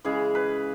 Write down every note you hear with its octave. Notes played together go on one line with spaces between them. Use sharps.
C#3 E3 G#3 G#4
B4